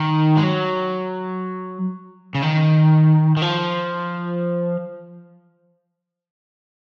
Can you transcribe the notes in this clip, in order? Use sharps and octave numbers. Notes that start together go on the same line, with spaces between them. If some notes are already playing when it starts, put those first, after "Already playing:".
Already playing: D#3
G#3
F#3
C#3
D#3
D#3
F3